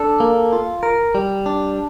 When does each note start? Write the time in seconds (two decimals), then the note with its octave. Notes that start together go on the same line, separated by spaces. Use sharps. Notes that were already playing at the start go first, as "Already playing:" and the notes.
Already playing: D4 A4
0.20 A#3
0.53 F4
0.83 A#4
1.15 G3
1.46 D4